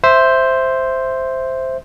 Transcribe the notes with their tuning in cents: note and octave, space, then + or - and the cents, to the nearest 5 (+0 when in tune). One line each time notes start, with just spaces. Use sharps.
C5 +0 E5 +0